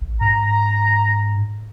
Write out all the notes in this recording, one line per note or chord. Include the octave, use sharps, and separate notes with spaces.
A1
G#2 A#5